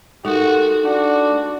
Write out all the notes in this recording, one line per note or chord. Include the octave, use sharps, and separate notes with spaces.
A3 D#4 F#4 G4 A#4
D4 F#4